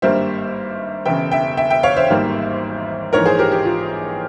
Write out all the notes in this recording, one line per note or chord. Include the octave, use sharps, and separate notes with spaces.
G#1 G2 G3 A#3 C5 E5
E1 E2 C#3 E5 G5
E5 G5
E5 G5
E5 G5
C#5 F5
C5 E5
G#1 G#2 G3 A#3
A#1 G#2 E3 A#4 C#5
G#4 C5
G4 A#4
G4
F4